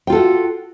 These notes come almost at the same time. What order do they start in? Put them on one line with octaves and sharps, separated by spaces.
G5 F4 A4 F#4